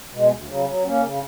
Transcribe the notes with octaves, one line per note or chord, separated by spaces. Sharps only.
B2 G#3
D2
C#3 F#3
F#3
A#3 C#4
C#3